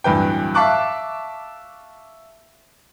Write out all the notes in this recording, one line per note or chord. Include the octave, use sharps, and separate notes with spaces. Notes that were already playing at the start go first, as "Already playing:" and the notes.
D1 G2 E3 B4 G5
E5 F5 A5 C#6 D6 F#6